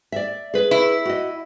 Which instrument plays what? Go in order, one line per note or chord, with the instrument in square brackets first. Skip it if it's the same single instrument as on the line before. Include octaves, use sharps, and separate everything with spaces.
[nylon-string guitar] D5 E5
G#4 B4
[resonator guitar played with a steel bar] E4
[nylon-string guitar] F#4 D#5